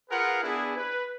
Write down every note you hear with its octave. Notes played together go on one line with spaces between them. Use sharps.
F4 G#4 A#4 B4 F5 F#5
B3 D4 E4 G#4
B4